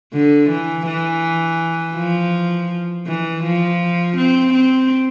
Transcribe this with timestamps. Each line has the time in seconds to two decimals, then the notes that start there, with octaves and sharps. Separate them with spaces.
0.13 D3
0.50 E3
0.87 E3
1.96 F3
3.07 E3
3.44 F3
4.17 C4
4.54 C4